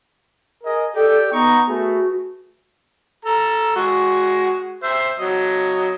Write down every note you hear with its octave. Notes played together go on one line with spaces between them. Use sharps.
G#4 A#4 D#5
G4 A4 D5 G5
B3 D#4 A#5 C#6
A3 F#4 G#4 B4
A4 A#5
G#3 F#4
C5 E5
F#3 D#5